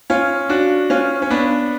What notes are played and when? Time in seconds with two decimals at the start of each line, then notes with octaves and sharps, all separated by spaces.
0.10 C#4 F4
0.49 D4 F#4
0.90 C#4 F4
1.22 C#4
1.30 B3 D4